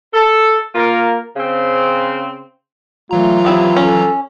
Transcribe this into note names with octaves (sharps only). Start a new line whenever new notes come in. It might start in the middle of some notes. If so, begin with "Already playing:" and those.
A4
A#3 F4 A#4
C#3 C4
E3 F#3 A3 F4 A#5
B3 C4 E4 G4
C#4 A4